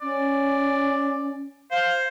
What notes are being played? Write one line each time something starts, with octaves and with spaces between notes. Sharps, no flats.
C#4 D5
C5 F5